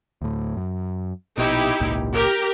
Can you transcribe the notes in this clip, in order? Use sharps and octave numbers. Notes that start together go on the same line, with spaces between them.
D2 A2
F#2
A#1 B2 D#4 E4 G4
G#1 C#2 A#2
G4 A#4